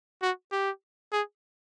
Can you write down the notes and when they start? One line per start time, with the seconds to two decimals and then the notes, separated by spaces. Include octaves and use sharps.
0.22 F#4
0.52 G4
1.12 G#4